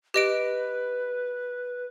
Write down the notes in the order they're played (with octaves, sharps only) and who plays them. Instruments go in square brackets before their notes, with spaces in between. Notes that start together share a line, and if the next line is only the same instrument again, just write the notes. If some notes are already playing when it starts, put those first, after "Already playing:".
[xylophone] G4 D#5 D7 [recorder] B4